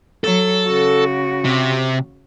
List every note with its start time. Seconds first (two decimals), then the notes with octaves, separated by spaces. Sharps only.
0.24 F#3 A4
0.67 C#3 F#4
1.45 C3